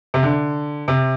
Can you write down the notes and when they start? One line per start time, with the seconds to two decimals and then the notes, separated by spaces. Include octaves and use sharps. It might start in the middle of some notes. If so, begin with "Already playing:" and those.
0.14 C3
0.23 D3
0.88 C3